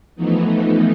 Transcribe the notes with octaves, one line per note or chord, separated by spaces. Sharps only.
E3 F3 A3 B3 D#4